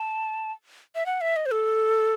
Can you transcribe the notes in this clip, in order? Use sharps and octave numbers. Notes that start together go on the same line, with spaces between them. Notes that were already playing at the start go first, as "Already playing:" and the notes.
Already playing: A5
E5
F#5
E5
D#5
C5
A4